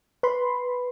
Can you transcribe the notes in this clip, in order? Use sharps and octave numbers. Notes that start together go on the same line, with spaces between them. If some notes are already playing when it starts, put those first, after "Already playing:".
B4 B5 C6